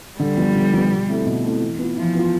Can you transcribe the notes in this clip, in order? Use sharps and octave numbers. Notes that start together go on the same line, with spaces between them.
D3 G3
F3 B3
D3
F3 B3
B2
A3 C4 E4 A4
B2
A3 C4 E4 A4
E3
B3 F4
E3 F3
B3 F4